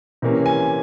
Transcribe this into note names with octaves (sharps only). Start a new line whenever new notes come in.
C3 E3 A#3 C#4
G#5